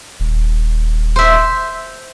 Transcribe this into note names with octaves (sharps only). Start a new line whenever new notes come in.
D#1
C5 E5